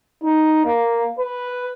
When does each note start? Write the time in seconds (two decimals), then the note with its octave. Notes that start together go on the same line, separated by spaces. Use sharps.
0.22 D#4
0.64 A#3
1.19 B4